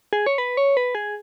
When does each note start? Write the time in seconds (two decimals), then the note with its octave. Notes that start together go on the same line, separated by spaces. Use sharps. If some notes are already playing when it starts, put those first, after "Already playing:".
0.13 G#4
0.26 C#5
0.38 B4
0.57 C#5
0.77 B4
0.95 G#4